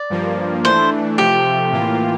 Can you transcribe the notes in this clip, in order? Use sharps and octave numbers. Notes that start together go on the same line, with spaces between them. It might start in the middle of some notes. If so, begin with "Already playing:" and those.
Already playing: D5
G2 F3 A#3
E3 A3 D4 C5
C3 F3 A3 G4
A2 E3 A#3 F4